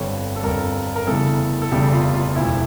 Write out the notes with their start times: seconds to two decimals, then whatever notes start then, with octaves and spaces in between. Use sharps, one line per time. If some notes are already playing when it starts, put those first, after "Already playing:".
Already playing: G1 F2 D3 G3 C#5
0.36 A4
0.43 G1 F2 D3 G3 A#4
0.96 A#4
1.07 F1 E2 C#3 E3 G3 A4
1.62 A4
1.71 F1 E2 C#3 E3 G3 G4
1.93 F4
2.14 F4
2.35 E1 D2 D3 F3 E4